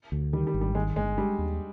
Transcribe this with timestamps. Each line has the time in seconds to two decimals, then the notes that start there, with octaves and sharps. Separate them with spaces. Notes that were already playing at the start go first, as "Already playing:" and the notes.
0.12 D2
0.33 D#3 G3
0.47 G3
0.54 G#1
0.61 G3
0.75 D#3 G#3
0.96 G1 G#3
1.18 G3 G#3
1.39 D#2